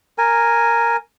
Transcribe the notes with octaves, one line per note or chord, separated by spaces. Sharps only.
A#4 G#5